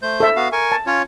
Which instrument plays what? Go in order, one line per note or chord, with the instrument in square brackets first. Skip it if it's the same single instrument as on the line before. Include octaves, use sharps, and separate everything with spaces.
[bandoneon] A3 C5 G6
[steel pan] A4 E5
[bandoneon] B3 F#4 F5
A#4 G#5 C#6
[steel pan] A5
[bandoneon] C#4 F4 C#5